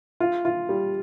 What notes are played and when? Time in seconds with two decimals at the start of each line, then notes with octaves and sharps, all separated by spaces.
0.20 F4
0.45 F4
0.69 G3